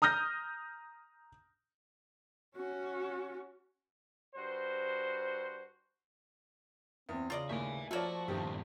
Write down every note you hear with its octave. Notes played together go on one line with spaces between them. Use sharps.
A#5 D#6 F6 G6 A#6
C#4 F#4
G2 F#4 C5
E2 C4
C#3 F4 D5 D#5
D#2 A2 E5 G#5
F3 A3 A#3 F4 F#4 C#5 D5
E2 G2 A#2 D#3 G4